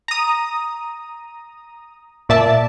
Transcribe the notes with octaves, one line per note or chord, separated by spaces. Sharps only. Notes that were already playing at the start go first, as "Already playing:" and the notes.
A#5 D#6
A#2 D5 E5 A5